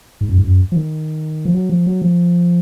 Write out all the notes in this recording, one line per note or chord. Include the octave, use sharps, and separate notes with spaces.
G#2
F#2
G#2
F#2
F3
D#3
F3
F#3
F3
F#3
F3